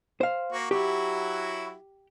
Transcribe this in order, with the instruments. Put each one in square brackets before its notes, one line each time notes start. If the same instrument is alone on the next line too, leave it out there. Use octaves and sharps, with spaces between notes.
[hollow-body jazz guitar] C5 F5
[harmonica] A#3 F#4
[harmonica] F#3 E4 F#4 [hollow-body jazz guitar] G4